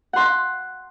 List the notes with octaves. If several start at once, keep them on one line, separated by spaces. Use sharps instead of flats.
F#5 C6